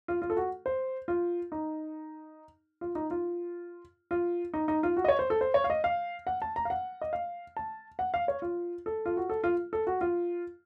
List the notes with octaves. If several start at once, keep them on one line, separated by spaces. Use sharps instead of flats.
F4
F4
A4
F#4
C5
F4
D#4
F4
D#4
F4
F4
D#4
D#4
F4
F#4
D#5
C#5
C5
A4
C5
C#5
F5
D#5
F5
F#5
A5
A#5
F5
F#5
D#5
F5
A5
F#5
F5
C#5
F4
A4
F4
F#4
A4
F4
A4
F#4
F4